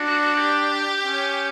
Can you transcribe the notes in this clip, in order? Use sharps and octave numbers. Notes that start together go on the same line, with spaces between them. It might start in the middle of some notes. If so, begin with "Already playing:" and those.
Already playing: D4 F#4
G4
C#4